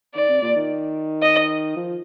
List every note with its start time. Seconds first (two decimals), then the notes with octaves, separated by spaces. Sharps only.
0.15 D#3 D5
0.28 C3
0.42 A#2
0.56 D#3
1.22 D#5
1.77 F3